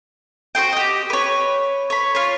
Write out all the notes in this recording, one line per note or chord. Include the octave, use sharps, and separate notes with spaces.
F#4 G#4 C5 G5
G4 D#5
B4 C#5
C#5 B5
F4 C#5